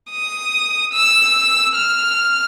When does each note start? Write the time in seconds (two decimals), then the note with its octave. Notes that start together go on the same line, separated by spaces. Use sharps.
0.11 D#6
0.93 E6
1.76 F6